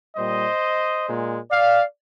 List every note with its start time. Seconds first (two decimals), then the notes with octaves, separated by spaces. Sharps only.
0.16 A#2 G3 C5 D#5
1.06 A#2 G#3
1.51 D5 F5